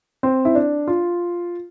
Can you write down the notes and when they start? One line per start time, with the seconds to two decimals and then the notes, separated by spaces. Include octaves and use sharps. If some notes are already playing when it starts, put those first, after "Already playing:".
0.23 C4
0.45 E4
0.55 D4
0.88 F4